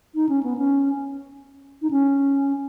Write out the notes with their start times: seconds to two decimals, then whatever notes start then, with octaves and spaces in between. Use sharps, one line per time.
0.15 D#4
0.29 C#4
0.43 B3
0.57 C#4
1.82 D#4
1.91 C#4